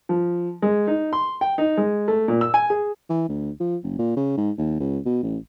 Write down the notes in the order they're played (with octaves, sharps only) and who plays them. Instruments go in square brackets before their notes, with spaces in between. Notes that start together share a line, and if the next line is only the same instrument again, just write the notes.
[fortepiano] F3
G#3
D#4
C6
G5
D#4
G#3
A3
A#2
E6
G#5
G#4
[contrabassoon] E3
D2
F3
F#1
A#2
C#3
G#2
D#2
C#2
B2
A1